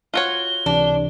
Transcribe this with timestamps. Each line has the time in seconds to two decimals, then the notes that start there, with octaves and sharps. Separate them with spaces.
0.14 F4 F#4 C#5 G7
0.66 C#2 C3 E3 D4